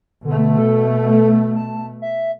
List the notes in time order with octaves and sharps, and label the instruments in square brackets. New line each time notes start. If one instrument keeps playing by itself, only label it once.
[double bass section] B2 A3 [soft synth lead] D3
[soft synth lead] A4
A5
E5